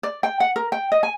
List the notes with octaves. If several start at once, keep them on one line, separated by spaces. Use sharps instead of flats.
D5
G5
F#5
A#4
G5
D#5
G#5